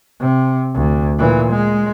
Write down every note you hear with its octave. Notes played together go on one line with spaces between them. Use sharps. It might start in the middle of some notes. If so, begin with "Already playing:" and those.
C3
D2
A#2 E3
G#3